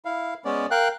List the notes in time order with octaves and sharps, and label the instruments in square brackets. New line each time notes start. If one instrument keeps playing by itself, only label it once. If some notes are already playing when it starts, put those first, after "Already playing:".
[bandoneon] E4 F5
G#3 B3 C#4 D5
A#4 F5 G5 F#6